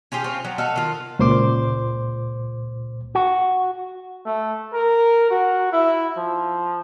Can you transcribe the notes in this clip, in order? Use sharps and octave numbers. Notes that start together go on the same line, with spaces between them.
C#4 F4 G4 G#4
C4 C#4 F4
F3 F#3
F#4 A4 D#5 F5
D#3 F4
C#2 A#2 C5 C6 D6
F#4
A3
A#4
F#4
E4
F3